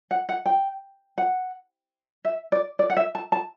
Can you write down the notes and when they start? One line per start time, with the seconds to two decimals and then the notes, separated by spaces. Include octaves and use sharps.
0.11 F#5
0.29 F#5
0.46 G5
1.18 F#5
2.25 E5
2.52 D5
2.79 D5
2.90 F#5
2.97 E5
3.15 A5
3.32 A5